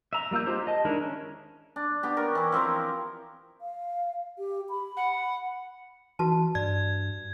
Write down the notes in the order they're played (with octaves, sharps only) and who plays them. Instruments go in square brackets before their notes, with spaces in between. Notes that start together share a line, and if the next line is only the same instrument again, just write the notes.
[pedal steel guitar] E5 A#5
G3 A#3 F4 E6 G6
G#3 F4 G4 C5 A#5
D#5 A5
D#3 G#3 D4 E4 A#4
C#4
[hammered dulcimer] D4
B3 D4 G4
A#4 C#5
E3 E4
F3 C4 E4 A#4
[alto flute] F5
G4
B5
[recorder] F#5
[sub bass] E3 [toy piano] F#4 B4 A5
[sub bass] G2 [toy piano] D5 [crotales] G#6